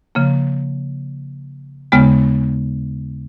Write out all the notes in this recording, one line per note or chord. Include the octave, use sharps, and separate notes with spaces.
C#3 F3 A#3
D#2 C#3 G#3 B3